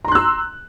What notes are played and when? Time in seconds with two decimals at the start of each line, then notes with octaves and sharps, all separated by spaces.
0.05 A#5
0.08 C6
0.12 F#6
0.15 E6